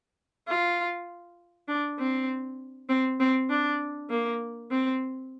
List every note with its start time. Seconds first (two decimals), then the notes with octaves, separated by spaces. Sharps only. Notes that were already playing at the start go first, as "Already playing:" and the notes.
0.47 F4
1.68 D4
1.98 C4
2.89 C4
3.20 C4
3.49 D4
4.10 A#3
4.71 C4